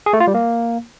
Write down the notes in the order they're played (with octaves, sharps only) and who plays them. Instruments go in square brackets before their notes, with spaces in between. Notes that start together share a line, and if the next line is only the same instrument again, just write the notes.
[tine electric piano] G#4
A3
F4
G3
A#3